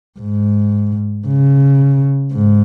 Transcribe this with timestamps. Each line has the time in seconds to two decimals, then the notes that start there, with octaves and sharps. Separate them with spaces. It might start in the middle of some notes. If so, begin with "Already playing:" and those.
0.20 G#2
1.27 C#3
2.33 G#2